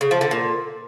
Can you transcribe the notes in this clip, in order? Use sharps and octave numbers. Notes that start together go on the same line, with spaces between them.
C#3
F3
D3
A#2